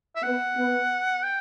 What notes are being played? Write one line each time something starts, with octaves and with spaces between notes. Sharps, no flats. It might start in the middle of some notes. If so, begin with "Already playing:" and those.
E5
B3 F#5
B3
G5